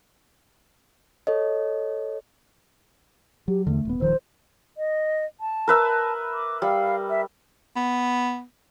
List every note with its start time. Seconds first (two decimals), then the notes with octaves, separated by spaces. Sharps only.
1.27 A4 C#5 D#5
3.48 F#3 G4
3.67 E2 D3 A3
3.85 D#1 B3
4.00 D#1 D#3 F3 C5
4.77 D#5
5.41 A5
5.68 A#4 B4 E5
6.33 D6
6.62 G3 F5
7.10 E5
7.76 B3